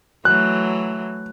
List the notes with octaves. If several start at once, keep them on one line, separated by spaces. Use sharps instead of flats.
E3 F#3 A3 F#6